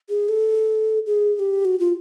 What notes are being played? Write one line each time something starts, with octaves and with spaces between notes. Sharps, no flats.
G#4
A4
G#4
G#4
G4
F#4
F4